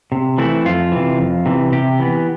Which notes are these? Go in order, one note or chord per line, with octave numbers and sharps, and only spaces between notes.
C3
E3 A3 C4 E4
F2 F4
C3 E3
F2
C3 E3
C3 G4
E3 B3